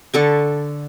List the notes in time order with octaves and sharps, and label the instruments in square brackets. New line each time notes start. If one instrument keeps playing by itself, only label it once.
[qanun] D3 A4 C#6